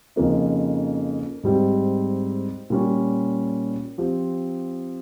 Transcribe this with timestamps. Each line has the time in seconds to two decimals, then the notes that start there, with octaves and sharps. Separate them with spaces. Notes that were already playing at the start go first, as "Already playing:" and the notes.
0.16 F2 C#3 F3 A#3 D#4
1.43 G#2 G3 C4 G4
2.70 A#2 G3 C#4
3.98 F3 C4 G4